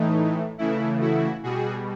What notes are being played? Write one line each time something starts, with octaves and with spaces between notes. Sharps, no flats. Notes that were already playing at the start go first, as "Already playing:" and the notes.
Already playing: A2 E3 A3 D#4
C#3 E3 A3 E4
E4 F#4
B2 G3 F#4 G#4